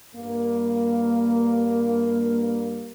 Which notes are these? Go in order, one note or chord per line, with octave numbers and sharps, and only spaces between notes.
G2 A#3